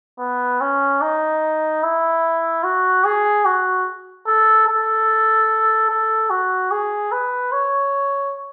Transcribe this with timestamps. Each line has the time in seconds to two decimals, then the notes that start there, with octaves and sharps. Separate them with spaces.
0.20 B3
0.61 C#4
1.01 D#4
1.83 E4
2.64 F#4
3.05 G#4
3.46 F#4
4.27 A4
4.68 A4
5.90 A4
6.30 F#4
6.71 G#4
7.12 B4
7.53 C#5